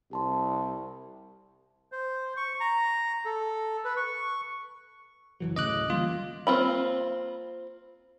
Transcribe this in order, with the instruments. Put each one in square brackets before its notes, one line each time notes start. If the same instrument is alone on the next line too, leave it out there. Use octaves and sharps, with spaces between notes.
[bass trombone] C2 [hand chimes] G4 A5 C6
[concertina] C5
C#6
A#5
A4
B4
C#6
[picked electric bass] F#1 E3 F#3
[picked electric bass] D2 A2 C#3 [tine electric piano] D#5 D6 F#6
[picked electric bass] E3 G3 A#3 [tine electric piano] F4
[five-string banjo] A#3 C4 F4 B5